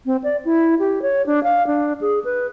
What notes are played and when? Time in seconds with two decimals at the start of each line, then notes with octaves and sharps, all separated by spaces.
0.06 C4
0.23 D5
0.45 E4
0.79 G4
1.02 C#5
1.26 D4
1.43 F5
1.67 D4
2.01 G#4
2.24 B4